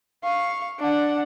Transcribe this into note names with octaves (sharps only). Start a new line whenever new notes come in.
F5 C#6
D4 F#5